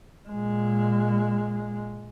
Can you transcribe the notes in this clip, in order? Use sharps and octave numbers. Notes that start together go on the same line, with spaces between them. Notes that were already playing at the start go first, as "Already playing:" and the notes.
A#2 G#3